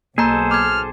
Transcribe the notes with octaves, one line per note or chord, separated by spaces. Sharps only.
B1 A#3 G#4 A4 C5 A#5
D6 F6 G#6